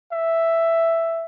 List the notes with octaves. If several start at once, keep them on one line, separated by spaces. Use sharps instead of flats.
E5